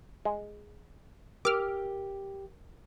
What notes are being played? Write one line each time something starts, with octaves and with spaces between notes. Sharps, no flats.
G#3
G4 A#4 D6 F6